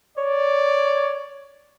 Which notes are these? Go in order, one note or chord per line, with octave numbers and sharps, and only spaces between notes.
C#5 D5